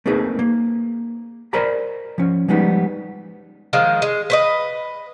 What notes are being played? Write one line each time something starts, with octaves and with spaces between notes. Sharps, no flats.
A3 A#3 C4 D#4 G#4 B4
A#3
A#4 C5 D5 D#5 A#5 B5
F3 C#4
F3 G3 G#3 B3 D#4
D#3 F3 G#3
G#3
B4 C#5 D#5